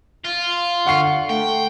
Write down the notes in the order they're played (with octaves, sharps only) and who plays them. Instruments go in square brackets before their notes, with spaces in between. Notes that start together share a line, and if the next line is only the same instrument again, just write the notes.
[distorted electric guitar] F4
[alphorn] D3 [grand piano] F#5 C#6 C7
[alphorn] A3 [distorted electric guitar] G5